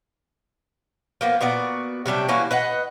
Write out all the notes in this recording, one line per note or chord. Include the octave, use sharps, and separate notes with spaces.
F3 A#3 B3
A#2 B3 F#4 D5
C3 F#3 G3 D4
E3 A#3 C#4 F#4
B4 D#5 F#5